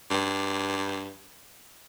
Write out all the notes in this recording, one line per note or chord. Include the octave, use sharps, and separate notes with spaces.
G2